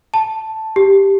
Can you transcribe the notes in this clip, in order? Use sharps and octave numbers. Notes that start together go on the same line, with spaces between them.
A5
G4